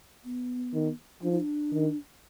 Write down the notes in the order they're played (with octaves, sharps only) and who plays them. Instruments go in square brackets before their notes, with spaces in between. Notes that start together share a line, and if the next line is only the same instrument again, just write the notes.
[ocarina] B3
[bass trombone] D#3
[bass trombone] F3 [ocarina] D4
[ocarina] D#4
D4
[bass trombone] D#3